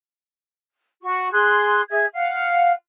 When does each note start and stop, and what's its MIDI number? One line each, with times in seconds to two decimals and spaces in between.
1.02 1.30 66
1.02 1.30 85
1.32 1.81 68
1.32 1.81 84
1.32 1.81 90
1.89 2.05 68
1.89 2.05 76
1.89 2.05 92
2.13 2.72 77
2.13 2.72 78